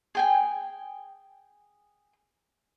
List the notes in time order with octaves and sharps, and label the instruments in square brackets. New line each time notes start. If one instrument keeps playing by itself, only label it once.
[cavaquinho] G#4 G5 G#5